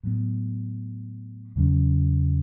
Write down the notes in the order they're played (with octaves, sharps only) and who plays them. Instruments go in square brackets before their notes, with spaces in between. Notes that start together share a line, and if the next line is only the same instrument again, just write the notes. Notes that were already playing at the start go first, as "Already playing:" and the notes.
[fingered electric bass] A2 F#3 B3
E2 C#3 F#3 C#4